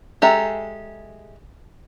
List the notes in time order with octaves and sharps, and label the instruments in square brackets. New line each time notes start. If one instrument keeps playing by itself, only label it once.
[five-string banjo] G#3 G4 A4 E5 A#5